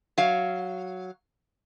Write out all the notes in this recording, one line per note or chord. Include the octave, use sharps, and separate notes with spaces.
F#3 F5